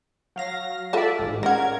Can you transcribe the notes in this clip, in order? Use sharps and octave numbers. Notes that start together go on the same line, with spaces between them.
F#3 F5 A#6
F4 A4 D5 E5 A5
A1 G#2
C#3 A#4 F#5 G#6